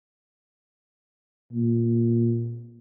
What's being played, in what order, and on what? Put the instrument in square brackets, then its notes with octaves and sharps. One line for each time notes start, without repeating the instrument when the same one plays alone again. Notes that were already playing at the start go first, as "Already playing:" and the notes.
[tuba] A#2